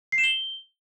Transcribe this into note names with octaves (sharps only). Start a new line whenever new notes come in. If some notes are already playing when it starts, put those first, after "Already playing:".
C7
E7
G7